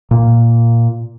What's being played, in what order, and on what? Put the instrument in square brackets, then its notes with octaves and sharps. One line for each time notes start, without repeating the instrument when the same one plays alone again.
[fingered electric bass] A#2